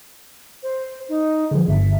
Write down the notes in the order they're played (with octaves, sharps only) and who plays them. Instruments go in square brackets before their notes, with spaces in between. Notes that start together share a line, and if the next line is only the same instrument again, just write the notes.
[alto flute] C5
D#4
[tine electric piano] D3 F3 [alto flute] G#4
[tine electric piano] G1 [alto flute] E5